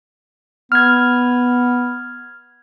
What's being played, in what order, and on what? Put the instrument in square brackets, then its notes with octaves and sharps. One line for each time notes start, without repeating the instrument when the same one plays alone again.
[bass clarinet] B3 [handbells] F6 G#6